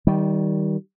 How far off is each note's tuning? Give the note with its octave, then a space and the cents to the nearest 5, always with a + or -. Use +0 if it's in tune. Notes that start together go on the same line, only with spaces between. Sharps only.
D#3 +15 G3 -15